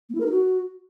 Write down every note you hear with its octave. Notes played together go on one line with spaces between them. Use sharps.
A#3
E4
A#4
D#4
F#4